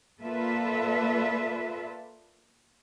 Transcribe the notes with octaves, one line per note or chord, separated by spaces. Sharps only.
A#3 F4 A4 B4 D5 E5